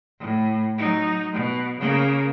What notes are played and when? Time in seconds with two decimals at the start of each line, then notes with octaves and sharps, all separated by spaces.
0.20 A2
0.78 F#3 D#4
1.33 B2
1.80 C#3 A#3